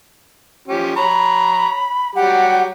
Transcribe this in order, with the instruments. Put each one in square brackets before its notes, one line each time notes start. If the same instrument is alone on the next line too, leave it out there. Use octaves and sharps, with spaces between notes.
[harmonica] F3 C#4 G4
[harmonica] C#5 A#5 [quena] B5
[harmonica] F#3 G3 G4 [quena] F#5